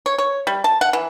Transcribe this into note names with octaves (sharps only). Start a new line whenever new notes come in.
C#5
C#5
G3
A5
F#5
E3